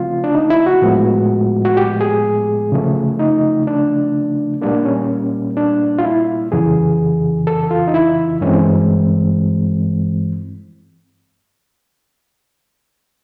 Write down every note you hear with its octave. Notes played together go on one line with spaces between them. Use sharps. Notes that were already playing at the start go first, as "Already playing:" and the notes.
Already playing: C#3 F3 A3 C4 F4
D4
D#4
E4
F#4
A2 F3 G#3 B3
F#4
G4
G#4
C#3 F3 A3
D#4
D4
A#2 G3 A#3 D4
C#4
D4
F4
E4
F2 C#3 E3 G#4
A4
F4
D#4
E4
G2 E3 G#3 C4 C#4